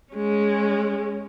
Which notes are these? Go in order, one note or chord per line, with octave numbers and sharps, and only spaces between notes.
G#3 C#4